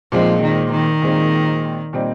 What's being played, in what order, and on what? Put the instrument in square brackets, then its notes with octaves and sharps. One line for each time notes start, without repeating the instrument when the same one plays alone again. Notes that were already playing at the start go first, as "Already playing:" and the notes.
[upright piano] A#2 G#3 C4 D#4 [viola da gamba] F3
[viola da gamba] D#3
D#3
[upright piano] A#2 G#3 C4 D#4
A#2 G3 C4 D#4